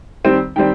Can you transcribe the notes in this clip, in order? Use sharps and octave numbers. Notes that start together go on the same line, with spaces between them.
D#3 G3 C4
D#3 G3 C4 G5